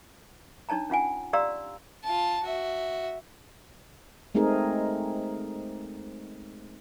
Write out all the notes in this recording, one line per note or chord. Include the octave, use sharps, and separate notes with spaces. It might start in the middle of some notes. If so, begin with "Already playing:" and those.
D4 D#4 C#5 A5 A#5
C#4 F4 F#5 G#5
G4 D5 F5 A#5 C6 E6
F4 A5
F#4 E5
G#3 A3 C4 D#4 G#4 A#4